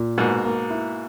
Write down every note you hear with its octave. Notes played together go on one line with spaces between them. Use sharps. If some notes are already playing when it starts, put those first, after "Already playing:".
Already playing: A#2
G#2 B2 A#3
A#3
E4